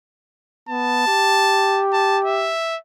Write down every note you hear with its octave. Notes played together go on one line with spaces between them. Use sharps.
B3 A5
G4
A5
E5